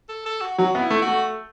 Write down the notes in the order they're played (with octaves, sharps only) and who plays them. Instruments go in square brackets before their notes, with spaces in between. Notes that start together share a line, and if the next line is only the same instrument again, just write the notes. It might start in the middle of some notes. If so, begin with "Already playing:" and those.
[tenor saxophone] A4
A4
F#4
[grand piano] F#3 [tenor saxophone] F#4
[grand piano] B3
[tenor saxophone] E4
[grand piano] A3
[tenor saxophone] F#4
[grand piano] A3